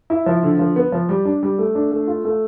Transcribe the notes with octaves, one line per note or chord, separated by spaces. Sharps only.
E4
F3
D3
F3
B3
F3
G3
D4
G3
A3
D4
A3
F4
A3